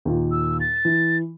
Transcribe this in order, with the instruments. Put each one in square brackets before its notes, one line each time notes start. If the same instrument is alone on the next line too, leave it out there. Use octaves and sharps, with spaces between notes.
[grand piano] D#2 A#2
[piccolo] E6
A6
[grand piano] E3